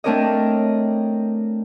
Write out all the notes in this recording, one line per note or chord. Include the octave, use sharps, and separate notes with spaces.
A3 C4 D4 A#4 C#5 D#5